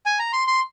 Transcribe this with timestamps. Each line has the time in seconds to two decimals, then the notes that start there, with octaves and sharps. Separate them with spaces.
0.06 G#5
0.19 A#5
0.33 C6
0.48 C6